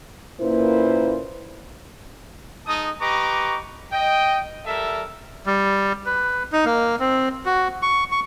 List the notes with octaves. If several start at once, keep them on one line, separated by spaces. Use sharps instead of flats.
A#2 A#3 C#4 E4 B4 C5
G#3 D#4 A5 D#6
G4 B4 D#5 A#5 C#6 D6
D#5 G5
G3 A4 A#4 E5
G3
B4
D#4
A#3
C4
F#4
C#6
C#6